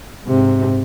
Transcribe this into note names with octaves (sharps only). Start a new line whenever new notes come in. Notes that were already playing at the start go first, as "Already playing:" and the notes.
G#2 C3